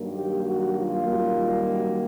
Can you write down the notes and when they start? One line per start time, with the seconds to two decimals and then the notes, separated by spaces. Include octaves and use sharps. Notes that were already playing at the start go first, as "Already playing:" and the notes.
Already playing: G2 D#3 F#3 A#3
0.13 G4
0.43 F#4
0.76 F4
1.07 F#2 D#3 G3 A#3
1.70 F#4